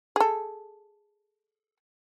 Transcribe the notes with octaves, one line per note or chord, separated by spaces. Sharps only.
G#4 A4